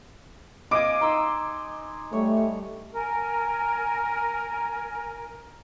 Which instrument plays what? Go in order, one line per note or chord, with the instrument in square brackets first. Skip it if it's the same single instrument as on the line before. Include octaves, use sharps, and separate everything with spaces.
[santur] D#5 F5 G#5 [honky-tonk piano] D6 D7
[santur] D#4 C6 E6
[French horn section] G3 A3 [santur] C#5
[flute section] A#4 G#5